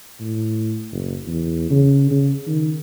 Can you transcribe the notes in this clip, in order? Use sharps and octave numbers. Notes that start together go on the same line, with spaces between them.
A2
F#1
E2
C#3
C#3
D#3